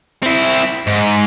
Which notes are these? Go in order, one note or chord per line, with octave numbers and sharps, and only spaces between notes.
C4 E4
G#2